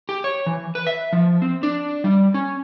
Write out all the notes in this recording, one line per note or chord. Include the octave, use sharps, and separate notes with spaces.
G4
C#5
E3
B4
E5
F3
C4
D4
G3
C#4